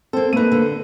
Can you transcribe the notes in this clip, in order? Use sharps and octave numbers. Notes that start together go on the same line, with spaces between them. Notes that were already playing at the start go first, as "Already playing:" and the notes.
A#3 C4 A4 C5
A3 A#3 D#4 B4 D#7
D3